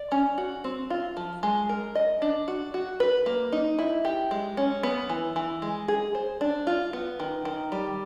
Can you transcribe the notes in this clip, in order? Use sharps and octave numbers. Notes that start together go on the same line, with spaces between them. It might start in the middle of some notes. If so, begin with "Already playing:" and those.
Already playing: D5
C#4
F#4
C4
F4
F3
G#3
A#4
D#5
D4
F#4
F#4
B4
A#3
D#4
E4
G4
G#3
C#4
B3
E3
E3
G#3
G#4
C5
D4
F4
B3
D#3
D#3
G3